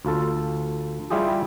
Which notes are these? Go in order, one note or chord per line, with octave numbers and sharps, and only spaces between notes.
D2 F4 A4
G3 E4 F4 G4 G#4